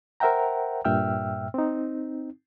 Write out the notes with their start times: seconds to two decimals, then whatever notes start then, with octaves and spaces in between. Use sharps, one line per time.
0.20 A#4 C5 E5 F#5 G5 A#5
0.85 G2 A#2 E5 G5 E6 F6
1.54 C4 D#4